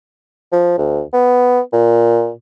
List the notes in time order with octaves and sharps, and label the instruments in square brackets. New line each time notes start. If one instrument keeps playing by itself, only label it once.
[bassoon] F3
D2
B3
A#2